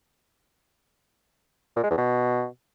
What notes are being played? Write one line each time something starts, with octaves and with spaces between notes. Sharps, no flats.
A#2
G#3
E2
B2